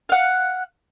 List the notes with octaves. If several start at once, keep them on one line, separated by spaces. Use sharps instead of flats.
F5 F#5